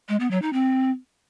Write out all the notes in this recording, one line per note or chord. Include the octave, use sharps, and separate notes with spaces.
G#3
B3
F#3
D#4
C4